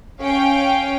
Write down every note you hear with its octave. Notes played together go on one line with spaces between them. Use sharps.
C#4 F5 G5